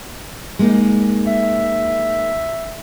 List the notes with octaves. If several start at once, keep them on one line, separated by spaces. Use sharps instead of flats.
G#3 A#3 D#4
E5